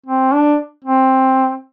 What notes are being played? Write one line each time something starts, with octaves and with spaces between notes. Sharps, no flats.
C4
D4
C4